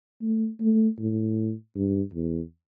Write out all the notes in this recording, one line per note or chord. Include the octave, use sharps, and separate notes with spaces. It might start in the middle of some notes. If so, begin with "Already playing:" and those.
A3
A3
A2
G2
E2